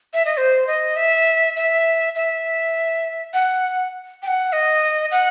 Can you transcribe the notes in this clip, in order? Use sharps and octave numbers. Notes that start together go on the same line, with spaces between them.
E5
D#5
C5
D#5
E5
E5
E5
F#5
G5
F#5
D#5
F#5